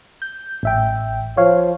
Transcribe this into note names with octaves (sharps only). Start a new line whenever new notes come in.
G6
A1 E5 G5
F3 C#5 F5